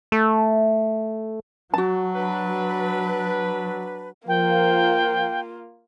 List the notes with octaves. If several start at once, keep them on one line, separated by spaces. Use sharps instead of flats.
A3
F#3 F#4 A5
D4 B4
F3 A#3 F4 A#4 G5